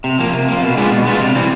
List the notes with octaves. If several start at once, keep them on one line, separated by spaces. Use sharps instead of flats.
C3
F3 A#3
C3
F3 A#3
B2
G#3 B3 D4 F4
B2
G#3 B3 D4 F4
C3
E3 G3 C4